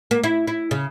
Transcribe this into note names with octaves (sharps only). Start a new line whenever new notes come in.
A#3
E4
E4
C#3